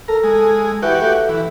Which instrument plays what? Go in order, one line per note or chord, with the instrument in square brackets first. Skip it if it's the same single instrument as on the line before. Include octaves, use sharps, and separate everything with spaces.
[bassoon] A4 [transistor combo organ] A#4
[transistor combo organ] G#3
[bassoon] E3 [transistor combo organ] F#4 G4
[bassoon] A3
[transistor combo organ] E3